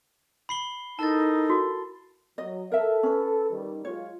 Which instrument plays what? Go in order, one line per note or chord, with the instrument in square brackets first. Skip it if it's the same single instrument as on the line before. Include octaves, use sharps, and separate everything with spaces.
[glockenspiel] B5 C7 G7
[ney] D#4 [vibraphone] E4 A4 A#4 [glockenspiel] A5 A6
[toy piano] F#4
[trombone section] F#3 [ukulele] D#5
[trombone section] A4 [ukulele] A#4 E5
[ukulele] C#4 B4
[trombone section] D#3 G3
[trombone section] F#3 G#3 F4 [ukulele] C#5